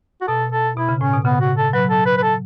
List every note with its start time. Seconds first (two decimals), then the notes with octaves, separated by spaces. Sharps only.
0.21 F#4
0.28 B2 A4
0.52 A4
0.77 B2 E4
0.89 C#3
1.01 A2 C#4
1.13 B2
1.25 C#3 B3
1.41 F#4
1.57 A4
1.73 F#3 B4
1.90 A4
2.06 B4
2.18 B4
2.23 A4